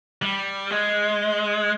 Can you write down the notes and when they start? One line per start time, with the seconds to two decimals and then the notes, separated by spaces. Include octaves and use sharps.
0.22 G3
0.71 G#3